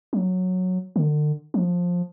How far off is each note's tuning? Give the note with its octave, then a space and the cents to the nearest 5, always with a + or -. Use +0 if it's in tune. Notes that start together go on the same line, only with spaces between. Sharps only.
F#3 -10
D3 +35
F3 +15